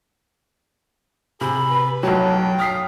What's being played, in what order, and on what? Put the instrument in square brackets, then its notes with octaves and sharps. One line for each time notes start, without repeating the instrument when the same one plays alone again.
[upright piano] C3 [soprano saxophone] G#4 [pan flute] B5
[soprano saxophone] B4
[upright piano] B1 F#3 [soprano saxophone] G5 [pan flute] A5
[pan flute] D#6 [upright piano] F6 B6 C7